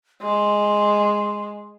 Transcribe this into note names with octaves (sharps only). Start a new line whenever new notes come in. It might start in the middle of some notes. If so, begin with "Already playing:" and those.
G#3 C6